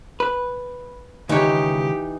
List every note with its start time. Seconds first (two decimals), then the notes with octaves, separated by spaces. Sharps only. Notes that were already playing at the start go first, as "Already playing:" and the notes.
0.20 B4
1.29 C#2 D#3 E3 D#4 G4 C#5 F#5 A#5